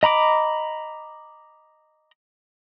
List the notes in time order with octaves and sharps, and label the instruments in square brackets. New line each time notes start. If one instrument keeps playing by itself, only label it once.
[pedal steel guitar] D#5 A#5 B5 D6